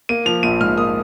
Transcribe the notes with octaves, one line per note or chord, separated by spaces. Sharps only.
A#3 D#7
F3 F7
A#1 D#7
G#2 F6
A#3 D#6